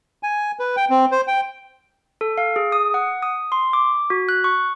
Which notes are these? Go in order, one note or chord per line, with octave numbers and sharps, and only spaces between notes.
G#5
B4
G5
C4
C5
G5
A4
F5
G#4
D#6
F#5
D#6
C6
D6
F#4
F#6
C#6